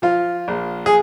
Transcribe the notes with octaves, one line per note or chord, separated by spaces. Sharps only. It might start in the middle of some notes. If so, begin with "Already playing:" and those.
F3 F4
A#1
G#4